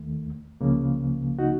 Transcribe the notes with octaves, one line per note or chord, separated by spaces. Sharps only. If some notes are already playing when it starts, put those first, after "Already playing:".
Already playing: D#2 D#3 A3
C#2 C#3 F3 A#3
D#4 F#4